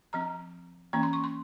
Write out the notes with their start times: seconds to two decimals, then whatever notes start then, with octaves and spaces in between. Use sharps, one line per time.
0.13 F3 C4 A#5
0.93 E3 A#3 C#4 A#5
1.03 C6
1.13 C#6
1.24 C6